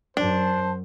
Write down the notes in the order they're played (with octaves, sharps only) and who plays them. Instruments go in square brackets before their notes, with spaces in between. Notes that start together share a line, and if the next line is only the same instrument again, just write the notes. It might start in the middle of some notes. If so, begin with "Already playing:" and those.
[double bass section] F#2 [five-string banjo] D4 [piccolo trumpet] C5 [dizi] A5